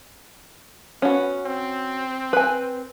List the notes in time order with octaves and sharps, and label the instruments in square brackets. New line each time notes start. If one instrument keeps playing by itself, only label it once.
[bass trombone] B3 [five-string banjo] C#4 F#4
[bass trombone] C4
[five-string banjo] B4 G#5